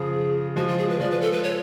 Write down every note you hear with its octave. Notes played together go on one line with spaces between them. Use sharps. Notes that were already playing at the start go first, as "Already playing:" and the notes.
Already playing: C#3 F3 G#4
F3 G#3 F#4
F4
G#4
B4
F3 G#3 D5
B4
A4
B4
C#5